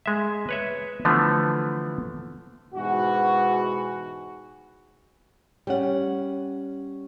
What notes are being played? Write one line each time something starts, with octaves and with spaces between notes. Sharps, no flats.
G#3 E5
B4 C#5 E5
D3 E3 F3 A3 B3
G#2 B2 E3 F#4
G3 C#4 F#5